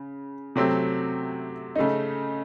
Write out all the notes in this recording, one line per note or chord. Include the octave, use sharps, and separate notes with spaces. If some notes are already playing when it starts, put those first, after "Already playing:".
Already playing: C#3
C3 F#3 A3 C4
C#3 A3 D#4